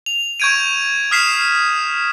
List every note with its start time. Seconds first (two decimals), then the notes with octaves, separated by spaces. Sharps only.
0.06 F7
0.40 C#6 G6 G#6 D7 D#7
1.11 D#6 F6 B6 C7 E7